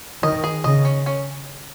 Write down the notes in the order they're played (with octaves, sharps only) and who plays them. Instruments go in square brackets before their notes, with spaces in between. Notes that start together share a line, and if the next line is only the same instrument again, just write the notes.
[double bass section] D#3 [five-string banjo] D#5
[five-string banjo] G#4
[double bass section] C#3 [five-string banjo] D#5
[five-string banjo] C#4
C#4